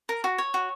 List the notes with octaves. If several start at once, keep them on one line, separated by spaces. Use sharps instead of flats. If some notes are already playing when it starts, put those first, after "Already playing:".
A#4
F#4
C#5
F#4